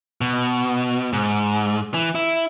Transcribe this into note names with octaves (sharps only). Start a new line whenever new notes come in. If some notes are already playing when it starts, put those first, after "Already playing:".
B2
G#2
E3
E4